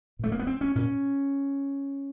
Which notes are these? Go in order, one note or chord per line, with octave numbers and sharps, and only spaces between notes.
A#2 A3
A#3
B3
C4
C#4
A#2 C#4